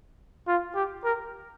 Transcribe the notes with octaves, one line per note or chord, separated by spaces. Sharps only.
F4
G4
A#4